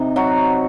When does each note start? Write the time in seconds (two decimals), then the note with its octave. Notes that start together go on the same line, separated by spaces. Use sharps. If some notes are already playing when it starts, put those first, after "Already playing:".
Already playing: C3 D#4
0.16 F#3 F#4